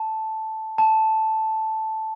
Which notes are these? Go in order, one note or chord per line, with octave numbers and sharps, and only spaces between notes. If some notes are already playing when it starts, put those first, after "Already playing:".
Already playing: A5
A5